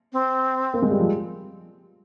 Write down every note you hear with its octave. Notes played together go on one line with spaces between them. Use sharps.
C4
A#3
G#3
G3
F3